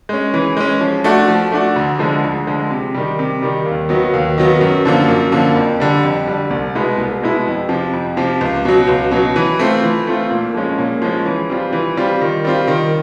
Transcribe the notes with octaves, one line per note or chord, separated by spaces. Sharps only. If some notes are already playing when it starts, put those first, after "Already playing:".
G#3 C#4
E3
G#3 C#4
F3
A3 D4 F#4
F3
A3 D4 F#4
D2
D3 F3 G#3
D2
D3 F3 G#3
C3
D#3 G3
C3
D#3 G3
D#2
D#3 F#3 B3
D#2
D#3 F#3 B3
F#2
D3 F3 A#3
F#2
D3 F3 A#3
F2
D3 G3
F2
D3 G3
C2
B2 G#3 B3 E4
C2
B2 G#3 B3 E4
F2
C3 F3
F2
C3 F3
C#2
B2 F#3
C#2
B2 F#3
E3
A3 C4 F4
E3
A3 C4 F4
A#2
F3 G#3 C#4
A#2
F3 G#3 C#4
E3
G3 C4 F4
E3
G3 C4 F4
D#3
G3 C4 F4
D#3